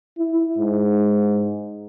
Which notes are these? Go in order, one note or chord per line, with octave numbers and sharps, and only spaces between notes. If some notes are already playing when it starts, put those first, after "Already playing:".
E4
G#2